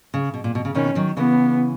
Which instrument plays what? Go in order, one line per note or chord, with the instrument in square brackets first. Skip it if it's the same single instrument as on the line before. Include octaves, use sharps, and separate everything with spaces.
[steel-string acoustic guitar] C#3
B2
A#2
B2
C#3
[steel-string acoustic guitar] B2 D#3 [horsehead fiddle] C#4
[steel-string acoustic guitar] D#3 F#3
[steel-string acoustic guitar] C#3 E3 [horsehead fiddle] B3